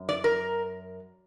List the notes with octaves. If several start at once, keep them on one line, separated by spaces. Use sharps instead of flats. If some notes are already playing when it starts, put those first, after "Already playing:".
Already playing: F#2
D5
A#4